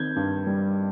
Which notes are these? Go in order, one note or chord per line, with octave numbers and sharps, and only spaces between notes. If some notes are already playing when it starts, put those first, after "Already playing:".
Already playing: D#3 C4 G6 G#6
G2
G3